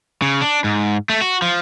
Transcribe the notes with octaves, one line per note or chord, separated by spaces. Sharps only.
C#3
D4
G#2
A3
F#4
F3